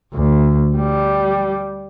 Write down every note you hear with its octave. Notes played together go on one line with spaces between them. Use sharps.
D2
G3